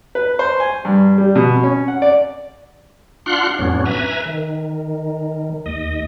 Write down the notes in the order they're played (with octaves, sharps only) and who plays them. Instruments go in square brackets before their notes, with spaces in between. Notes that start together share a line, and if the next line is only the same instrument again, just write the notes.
[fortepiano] B4
C5
G#5
G2
G3
B2
C#4
F#5
D5
[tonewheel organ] D4 F4 F5 F#5 C6 F#6
F2 A2 F#3 B3 C#4 D4
B4 E5 G#5 A#5
D#3
D#2 D#5